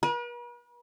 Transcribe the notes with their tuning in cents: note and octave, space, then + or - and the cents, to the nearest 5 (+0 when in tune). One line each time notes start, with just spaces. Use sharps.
B4 -45